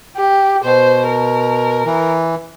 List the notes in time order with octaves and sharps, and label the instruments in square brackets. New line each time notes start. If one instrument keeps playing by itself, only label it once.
[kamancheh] G4
[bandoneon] B2 [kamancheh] C5
[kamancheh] A#4
[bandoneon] E3